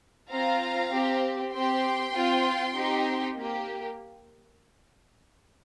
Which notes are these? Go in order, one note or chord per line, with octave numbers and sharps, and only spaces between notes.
C4 F4 F5 A#5
C4 G4
C4 G4 G5 C6
C4 F4
C4 D#4 G4
A#3 G4